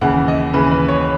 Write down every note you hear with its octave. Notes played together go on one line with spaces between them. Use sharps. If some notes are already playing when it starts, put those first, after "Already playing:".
D#2 C#3 E3 F#5
D#5
D#2 C#3 E3 B4
B4
C#5